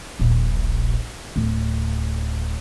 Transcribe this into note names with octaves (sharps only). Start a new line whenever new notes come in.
D#1 A#1
D1 A3